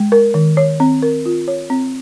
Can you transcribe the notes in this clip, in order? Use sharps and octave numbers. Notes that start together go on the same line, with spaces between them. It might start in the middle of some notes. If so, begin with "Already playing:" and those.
Already playing: G#3
A#4
D#3
C#5
C4
A#4
F4
C#5
C4